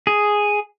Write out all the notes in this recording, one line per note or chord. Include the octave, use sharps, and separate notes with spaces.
G#4